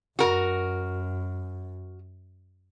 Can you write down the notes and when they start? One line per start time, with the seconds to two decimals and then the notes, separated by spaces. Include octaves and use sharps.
0.19 F#2 F#4 A#4